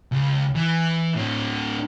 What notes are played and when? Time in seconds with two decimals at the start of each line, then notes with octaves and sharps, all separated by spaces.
0.12 C#2
0.55 E3
1.16 A2 D3